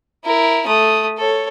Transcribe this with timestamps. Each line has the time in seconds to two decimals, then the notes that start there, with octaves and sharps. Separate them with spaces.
0.25 E4 A#4
0.66 A3 D#6
1.18 A4 C#5